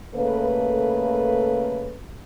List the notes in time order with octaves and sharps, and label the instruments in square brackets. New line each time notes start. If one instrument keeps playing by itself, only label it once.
[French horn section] C#3 A3 A#3 A4 B4